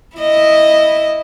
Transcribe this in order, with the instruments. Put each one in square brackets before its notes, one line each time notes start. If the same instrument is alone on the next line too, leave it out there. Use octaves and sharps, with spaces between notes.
[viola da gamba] E4 D#5